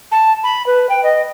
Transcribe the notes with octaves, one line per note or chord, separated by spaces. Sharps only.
A5
B5
B4
G5
D#5